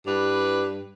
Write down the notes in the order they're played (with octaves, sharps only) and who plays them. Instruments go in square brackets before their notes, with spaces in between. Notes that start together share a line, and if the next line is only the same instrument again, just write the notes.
[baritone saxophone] G2 [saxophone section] E4 B4 D5